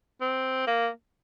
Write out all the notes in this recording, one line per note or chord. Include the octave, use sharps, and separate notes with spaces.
C4
A#3